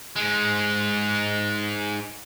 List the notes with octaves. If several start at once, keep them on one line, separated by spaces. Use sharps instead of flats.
G#2 G#3